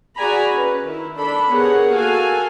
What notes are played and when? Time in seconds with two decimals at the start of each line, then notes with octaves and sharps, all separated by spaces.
0.17 F#4 G#4 D5 G#5 A#5 B5
0.52 C#4 B4
0.84 D#3 E4
1.16 D4 A4 B5
1.50 B3 G4 G#4 A#4 C#5 F#5
1.94 A#3 F#4 A4 F5 G#5